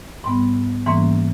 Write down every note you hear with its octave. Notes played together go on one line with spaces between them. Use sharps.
G#2 G3 B3
G#2 E3 G3 A#3 C#4